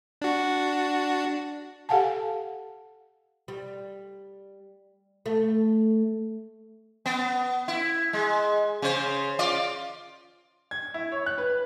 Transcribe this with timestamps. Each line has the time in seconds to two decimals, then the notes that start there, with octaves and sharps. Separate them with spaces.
0.22 D4 F#4
1.89 G4 A4 F5 F#5 G#5 A5
3.48 G3
5.26 A3
7.06 B3
7.68 E4
8.13 G#3
8.82 C#3 C5
9.39 F4 D5
10.71 G#6
10.94 E4
11.12 C#5
11.26 F#6
11.38 B4
11.50 B4